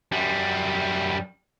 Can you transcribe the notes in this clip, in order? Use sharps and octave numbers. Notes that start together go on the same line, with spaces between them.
F#2 G3